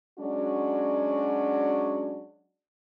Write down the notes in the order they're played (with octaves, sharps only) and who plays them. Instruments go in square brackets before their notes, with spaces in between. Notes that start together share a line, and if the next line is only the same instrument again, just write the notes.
[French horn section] F#3 G#3 C#4 D4 F#4 D5